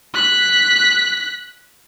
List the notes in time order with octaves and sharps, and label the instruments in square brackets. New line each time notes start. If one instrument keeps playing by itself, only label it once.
[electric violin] F#6 B6